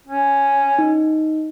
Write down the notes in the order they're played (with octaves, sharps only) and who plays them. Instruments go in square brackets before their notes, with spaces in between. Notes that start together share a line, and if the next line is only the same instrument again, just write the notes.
[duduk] C#4
[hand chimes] D#4